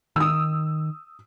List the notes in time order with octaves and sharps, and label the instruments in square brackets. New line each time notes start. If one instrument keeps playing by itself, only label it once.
[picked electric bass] D#3 [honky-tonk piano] D#6 E6